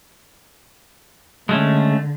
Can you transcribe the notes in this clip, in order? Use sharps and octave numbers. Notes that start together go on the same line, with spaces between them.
D3 G#3 A3 C#4